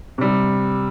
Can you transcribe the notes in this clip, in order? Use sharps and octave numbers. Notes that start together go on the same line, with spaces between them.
C3 G3